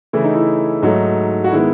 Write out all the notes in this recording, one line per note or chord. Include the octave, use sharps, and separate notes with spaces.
C#3 E3 A3 E4
D#4
E4
G#2 F#3 A3 D#4
F#4
D#3 G#3 B3 E4